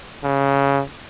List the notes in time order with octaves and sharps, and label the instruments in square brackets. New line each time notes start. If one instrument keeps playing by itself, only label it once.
[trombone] C#3